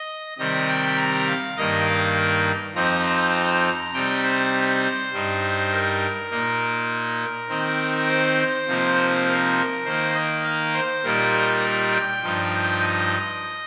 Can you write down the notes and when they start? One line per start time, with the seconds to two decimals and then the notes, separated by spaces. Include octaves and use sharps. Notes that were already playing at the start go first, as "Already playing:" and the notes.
Already playing: D#5
0.38 C3 D#3 G3 D#5
0.69 G5
0.97 A#5
1.27 F5
1.57 G2 D#3 A#3 D#4 D#5
1.87 F5
2.75 F2 F3 C4 D#4 A#5
3.93 C3 G3 D#4 G5
4.23 C5
5.13 G2 G3 D#4
5.72 A#4
6.31 A#2 A#3 D#4
7.49 D#3 C4 D#4
8.08 C5
8.68 C3 F3 A#3 D#4
9.26 A#4
9.85 D#3 A#3 D#4 C5
10.15 D#5
10.44 F5
10.74 C5
11.03 A#2 G3 A#3 D#4 A#4
11.63 A#5
11.92 G5
12.23 G2 F3 D#4
12.81 D#5